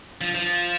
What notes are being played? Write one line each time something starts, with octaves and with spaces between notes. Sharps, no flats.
F3
F3